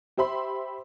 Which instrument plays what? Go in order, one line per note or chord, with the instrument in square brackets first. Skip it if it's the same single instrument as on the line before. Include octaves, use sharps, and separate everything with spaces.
[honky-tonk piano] G4 C5 E5 B5 C6